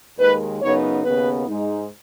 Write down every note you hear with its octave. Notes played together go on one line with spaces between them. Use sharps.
D#2 D#3 G#3 B4
F#2 C#3 B3 D#4 C#5
D#2 C#3 B3 B4
G#2 G#3 D#4